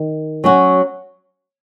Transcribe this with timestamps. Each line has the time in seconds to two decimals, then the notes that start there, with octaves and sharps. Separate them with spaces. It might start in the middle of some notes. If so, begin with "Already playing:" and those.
Already playing: D#3
0.44 F#3 C#4 F#4